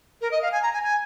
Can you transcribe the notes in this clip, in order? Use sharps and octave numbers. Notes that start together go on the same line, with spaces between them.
A#4
D#5
F5
G#5
A#5
G#5
G#5